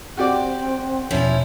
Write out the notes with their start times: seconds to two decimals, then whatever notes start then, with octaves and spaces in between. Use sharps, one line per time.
0.17 C4 F#4 G4 D5
1.11 E2 B2 F3 C#4 E4 C#5